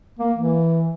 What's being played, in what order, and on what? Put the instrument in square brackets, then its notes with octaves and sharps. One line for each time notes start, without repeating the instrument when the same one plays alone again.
[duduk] A#3
E3